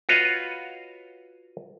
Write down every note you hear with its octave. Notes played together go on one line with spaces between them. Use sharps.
F4 F#4 B4 C#5 D#5 F5